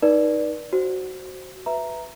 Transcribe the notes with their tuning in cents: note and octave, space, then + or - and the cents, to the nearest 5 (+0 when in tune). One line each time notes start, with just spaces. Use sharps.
D#4 +0 B4 -40 D5 +0
F#4 +10 C5 +10
B4 +0 E5 +0 A#5 +0